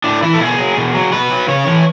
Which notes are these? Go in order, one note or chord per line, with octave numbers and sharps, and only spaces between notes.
A2 D4
E3 E4
A4
B2 G#4
F#3
B2
F#3
B2 B4
F#3
C#3 C#5
E3